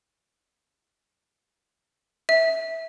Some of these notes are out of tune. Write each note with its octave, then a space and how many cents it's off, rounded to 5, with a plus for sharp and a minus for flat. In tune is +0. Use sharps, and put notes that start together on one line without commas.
E5 -15